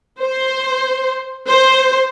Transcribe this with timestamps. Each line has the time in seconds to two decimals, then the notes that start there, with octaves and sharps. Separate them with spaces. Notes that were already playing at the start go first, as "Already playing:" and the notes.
0.22 C5
1.49 C5